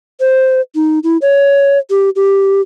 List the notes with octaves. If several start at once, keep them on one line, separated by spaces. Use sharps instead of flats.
C5
D#4
E4
C#5
G4
G4